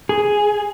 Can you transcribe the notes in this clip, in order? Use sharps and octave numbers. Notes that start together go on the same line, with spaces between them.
G#4